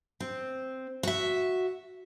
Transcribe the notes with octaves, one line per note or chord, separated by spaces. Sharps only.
C4
F#4 E5